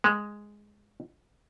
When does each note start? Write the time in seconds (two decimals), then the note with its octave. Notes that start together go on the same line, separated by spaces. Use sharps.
0.04 G#3